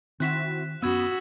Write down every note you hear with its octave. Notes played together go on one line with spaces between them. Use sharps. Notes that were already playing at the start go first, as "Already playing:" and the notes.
D#3 C4 E4 F#4 F#6 B6 E7
F#2 B3 C#4 F#4 B5 D#6 E6 G#6